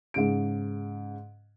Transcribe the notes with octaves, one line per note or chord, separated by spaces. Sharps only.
G#2 C#3 D7